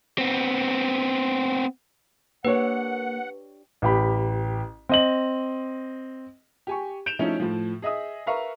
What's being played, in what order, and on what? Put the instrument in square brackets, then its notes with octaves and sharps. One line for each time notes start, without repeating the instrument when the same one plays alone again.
[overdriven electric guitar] B3 C4
[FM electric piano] A#3 [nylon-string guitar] D4 G4 C#5 [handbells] B4 [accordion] F#5
[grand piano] A1 G4 B5
C4 D#5 F#7
[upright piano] G4 G#5 C#6
G6 D7 E7 F7
F3 A3 C#4 D#4 E4
A2 F3
G#4 D#5 E5 D#6
A#4 B4 E5 F5 A#5 C#6